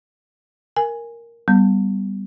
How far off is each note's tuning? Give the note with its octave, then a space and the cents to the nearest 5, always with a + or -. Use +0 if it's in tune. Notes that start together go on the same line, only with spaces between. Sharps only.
A#4 +0 G#5 -10
G3 +0 B3 +5